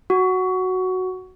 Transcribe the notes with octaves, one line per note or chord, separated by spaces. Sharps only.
F#4